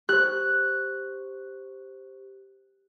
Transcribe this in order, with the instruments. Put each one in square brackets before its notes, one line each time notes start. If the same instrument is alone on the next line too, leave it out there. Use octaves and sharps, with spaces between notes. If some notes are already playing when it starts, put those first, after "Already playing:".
[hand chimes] G4 C5 [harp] F#6